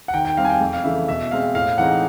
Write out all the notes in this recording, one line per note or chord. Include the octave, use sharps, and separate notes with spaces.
F#5
D#3 G5
G5
G3 C4 F5
G#5
G5
F2
F5
C#3 E3 A3 E5
B2 E5
G#3 C4 F5
A2 F5
E3 G#3 C4 D#4 F#5